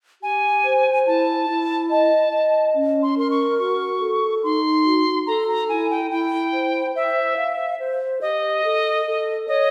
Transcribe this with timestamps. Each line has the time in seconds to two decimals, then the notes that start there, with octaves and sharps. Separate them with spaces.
0.22 G4 G#5
0.64 C5
1.06 E4 A5
1.49 E4
1.90 D#5 A5
2.32 D#5
2.74 C#4
3.02 C6
3.17 A#4 C6
3.31 C#6
3.58 F#4 C#6
4.00 A4
4.43 D#4 C6
4.84 F#4
5.27 A4 A#5
5.48 A#5
5.69 E4 G#5
5.91 G5
6.11 E4 G5
6.53 C5
6.95 C5 E5
7.37 F5
7.80 C5
8.21 G4 D#5
8.63 A4
9.05 A4
9.47 C#5 D#5